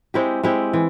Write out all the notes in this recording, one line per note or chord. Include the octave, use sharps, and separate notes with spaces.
G#3 C4 E4 G4
G#3 C4 E4 G4
E3